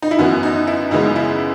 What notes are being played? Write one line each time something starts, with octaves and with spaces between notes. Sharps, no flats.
D#4
E4
F#2 E3 B3 F#4
D#4
E4
F#2 C#3 E3 G#3 B3 D#4
E4